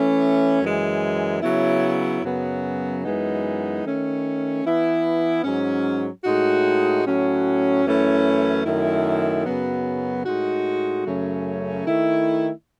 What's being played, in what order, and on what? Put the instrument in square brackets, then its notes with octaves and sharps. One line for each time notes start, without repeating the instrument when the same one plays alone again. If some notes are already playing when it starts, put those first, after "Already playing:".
Already playing: [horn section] E3 A3 C#4
F#2 E3 G#3
C#3 F#3 B3 E4
F#2 C#3 F#3 B3
F#2 E3 G#3 B3 D#4
D#3 A3 C#4
E3 B3 E4
G#2 F#3 C#4
A2 G#3 D#4 F#4
A2 F#3 C#4 F#4
F#2 E3 A3 C#4 E4
F#2 D#3 A3 E4
F#2 C#3 F#3 B3
A2 G#3 D#4 F#4
F#2 C#3 F#3 A3 C#4
D#3 A3 E4